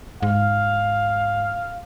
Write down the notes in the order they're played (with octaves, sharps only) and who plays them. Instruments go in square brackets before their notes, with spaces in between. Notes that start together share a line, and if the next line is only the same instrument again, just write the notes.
[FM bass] G#2 [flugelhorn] F5